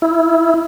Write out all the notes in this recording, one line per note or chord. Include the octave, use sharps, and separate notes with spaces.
E4